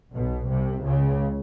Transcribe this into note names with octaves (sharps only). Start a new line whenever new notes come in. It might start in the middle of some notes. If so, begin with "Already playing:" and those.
B1 B2
C2 C3
C#2 C#3